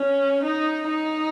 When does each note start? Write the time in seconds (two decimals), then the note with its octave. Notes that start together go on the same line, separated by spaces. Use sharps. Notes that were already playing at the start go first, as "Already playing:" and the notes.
Already playing: C#4
0.44 D#4
0.89 D#4